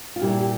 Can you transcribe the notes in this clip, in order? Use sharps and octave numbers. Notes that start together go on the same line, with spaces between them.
F4
A#2 G3 A#3 E4 G4
G4